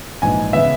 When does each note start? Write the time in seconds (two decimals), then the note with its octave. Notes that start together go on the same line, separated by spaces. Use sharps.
0.22 A#1 G#2 E3 G#5
0.53 C#3 E3 B3 E5